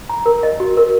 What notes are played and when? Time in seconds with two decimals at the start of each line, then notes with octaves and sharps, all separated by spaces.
0.10 A#5
0.26 A#4
0.43 D#5
0.60 F#4
0.77 A#4